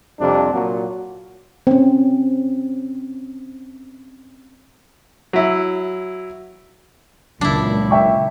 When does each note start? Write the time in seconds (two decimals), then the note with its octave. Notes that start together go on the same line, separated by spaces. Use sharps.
0.20 F2 C3 G3 D4
0.53 A#2 F#3 F#4
1.67 C4 C#4
5.33 F#3 E4
7.41 C#2 A#2 C#3 F#3 D4 E4
7.91 E5 G5 C#6